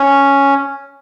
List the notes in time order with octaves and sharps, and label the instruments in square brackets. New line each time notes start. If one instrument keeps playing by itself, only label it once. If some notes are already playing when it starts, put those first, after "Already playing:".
Already playing: [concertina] C#4